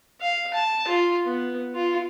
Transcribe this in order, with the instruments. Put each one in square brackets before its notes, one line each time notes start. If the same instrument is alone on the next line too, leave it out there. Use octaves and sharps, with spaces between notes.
[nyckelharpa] F5
A5
F4
B3
F4